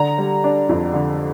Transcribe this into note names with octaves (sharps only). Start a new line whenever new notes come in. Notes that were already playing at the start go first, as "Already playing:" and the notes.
Already playing: D3 A#5
G3
D4
F2
D3